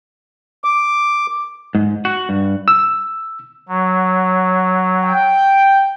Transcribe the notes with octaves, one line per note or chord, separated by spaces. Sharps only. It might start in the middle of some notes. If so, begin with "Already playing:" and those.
D6
G#2
F#4
G2
E6
F#3
G5